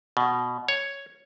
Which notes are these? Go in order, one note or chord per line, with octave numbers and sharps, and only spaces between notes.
B2
C#5